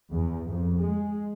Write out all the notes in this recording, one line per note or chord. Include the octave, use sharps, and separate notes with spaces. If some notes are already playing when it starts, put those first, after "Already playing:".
E2
F2
G#3